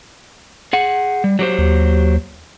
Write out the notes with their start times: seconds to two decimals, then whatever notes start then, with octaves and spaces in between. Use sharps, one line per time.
0.73 G#4 F#5
1.24 G3
1.39 F#3 G4 C5
1.58 D#2